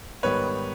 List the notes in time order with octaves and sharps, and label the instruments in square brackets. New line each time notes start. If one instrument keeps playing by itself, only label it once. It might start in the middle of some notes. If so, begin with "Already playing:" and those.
[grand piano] G#2 D#3 G3 B3 B4 C#5